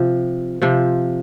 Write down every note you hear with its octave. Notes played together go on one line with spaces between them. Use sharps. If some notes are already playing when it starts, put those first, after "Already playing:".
Already playing: C3 F3
C3 F3